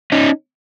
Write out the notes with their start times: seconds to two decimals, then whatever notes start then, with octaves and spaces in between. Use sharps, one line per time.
0.12 C#4 D#4